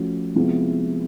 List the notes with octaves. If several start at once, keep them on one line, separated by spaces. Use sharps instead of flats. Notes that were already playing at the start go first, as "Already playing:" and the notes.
Already playing: F3 A3 C#4 F#4
C3 F3 G#3 B3 E4